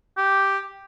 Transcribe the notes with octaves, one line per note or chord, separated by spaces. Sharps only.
G4